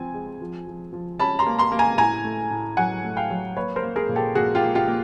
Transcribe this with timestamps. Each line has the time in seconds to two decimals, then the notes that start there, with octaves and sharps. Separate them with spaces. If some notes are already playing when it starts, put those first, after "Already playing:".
Already playing: F3 C4 G#5
0.14 G#3
0.41 F3
0.67 F3
0.93 F3
1.20 C#4 A5 B5
1.39 A#5 C6
1.47 A#3
1.59 A#5 C6
1.72 A#3
1.79 G#5 A#5
1.98 A2 G#5 A#5
2.24 A3
2.51 A2
2.77 F#3 F#5 G#5
3.04 A3
3.17 F5 G5
3.31 F#3
3.57 A#3 B4 C#5
3.76 A#4 C5
3.83 A#3
3.96 G#4 A#4
4.09 A#2
4.15 G4 A4
4.35 A#2 F#4 G#4
4.55 F4 G4
4.62 A#3
4.75 F4 G4
4.88 A#3